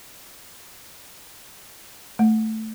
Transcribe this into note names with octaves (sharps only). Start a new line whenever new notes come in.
A3